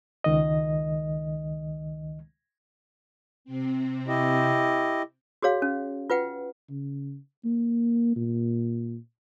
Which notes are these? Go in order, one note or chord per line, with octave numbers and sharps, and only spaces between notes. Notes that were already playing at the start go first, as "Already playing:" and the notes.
C#2 D#3 D#5
C3 C4
E4 G4 D#5
F#4 G#4 C#5 F5
C#4
F4 B4 F#5 G5
C#3
A#3
A#2